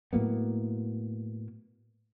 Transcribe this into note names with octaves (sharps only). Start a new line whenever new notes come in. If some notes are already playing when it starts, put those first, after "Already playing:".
A2 F#3 A#3 B3